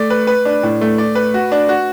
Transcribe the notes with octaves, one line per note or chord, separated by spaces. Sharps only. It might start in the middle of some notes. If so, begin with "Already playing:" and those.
Already playing: A3 D5
B4
B4
D4
A2
A3
D5
B4
F#4
D4
F#4